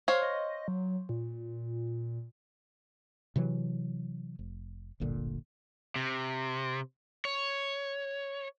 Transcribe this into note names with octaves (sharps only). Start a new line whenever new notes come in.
C5 C#5 F5
D#5
F#3
A#2
C3 E3 F#3
F1
D1 G1 A#2 D3
C3
C#5